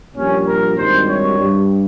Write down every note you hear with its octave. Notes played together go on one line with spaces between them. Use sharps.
A#1 A#2 G3 C#4
A#4
G#1 G2 D#3 G3 C5
C#5
G2 G3